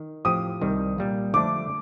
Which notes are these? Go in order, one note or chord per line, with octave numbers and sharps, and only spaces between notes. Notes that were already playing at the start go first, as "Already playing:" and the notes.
Already playing: D#3
A2 F3 C4 G4 D#6
C2 C3 D#3 G3
A#2 G3 A#3
D3 F3 A3 D4 D6